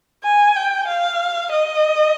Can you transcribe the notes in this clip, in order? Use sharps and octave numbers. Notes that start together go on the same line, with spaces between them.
G#5
G5
F5
D#5